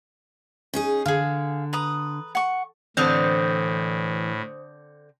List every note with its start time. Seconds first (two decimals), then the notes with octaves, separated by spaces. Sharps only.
0.74 C#4 D#4 G#4
1.06 D3 G#4 F5
1.73 B4 A#5 D#6
2.35 F#5 C#6
2.97 A2 D3 E3 C4 C5 D#6 G6